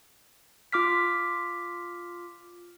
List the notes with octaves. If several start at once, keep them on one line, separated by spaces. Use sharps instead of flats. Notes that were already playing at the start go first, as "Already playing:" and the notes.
F4 D6 F6 B6